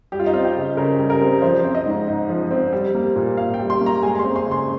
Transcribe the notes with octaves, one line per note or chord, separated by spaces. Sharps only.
G3 G4
F4
D#4
C4 F4
G4
C#3
C#3 A#4
G3
A#4
C4
F3 C5
C4
D#5
G#2
G#2
F3
C4
G3
A#3
A#2
A#2 F5
G5
G3
C6
A#3
A#5
G#3 G#5
C6
C4
C6
C#3
C6